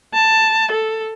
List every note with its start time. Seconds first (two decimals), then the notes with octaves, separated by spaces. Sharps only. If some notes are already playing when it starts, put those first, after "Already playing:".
0.14 A5
0.71 A4